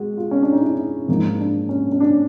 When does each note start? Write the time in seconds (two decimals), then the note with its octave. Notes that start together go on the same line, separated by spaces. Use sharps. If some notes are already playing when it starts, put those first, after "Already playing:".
Already playing: G#3 F#4
0.17 F4
0.31 C#4
0.42 D4
0.52 D#4
0.63 E4
1.08 G#2 F3 A#3 D#4
1.40 D4
1.69 C#4
1.92 C#4
2.00 D4